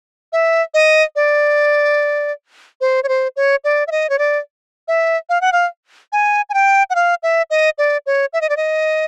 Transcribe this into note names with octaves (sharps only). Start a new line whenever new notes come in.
E5
D#5
D5
C5
C#5
C5
C#5
D5
E5
D#5
C#5
D5
E5
F5
F#5
F5
G#5
G#5
G5
F#5
F5
E5
D#5
D5
C#5
E5
D#5
D5
D#5